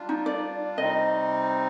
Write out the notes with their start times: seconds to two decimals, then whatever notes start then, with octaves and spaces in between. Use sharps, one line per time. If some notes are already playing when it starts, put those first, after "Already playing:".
Already playing: G3 D4 F4
0.09 D#4
0.26 D5
0.78 C3 G3 C4 D#4 D#5